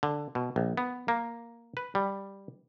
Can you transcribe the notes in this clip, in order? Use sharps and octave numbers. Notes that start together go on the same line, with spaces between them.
D3
B2
A#1
B3
A#3
B4
G3